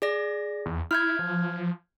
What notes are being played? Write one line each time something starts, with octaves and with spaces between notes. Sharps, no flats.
G#4 D5 A#6
E2
E4 F6 G6 G#6
F3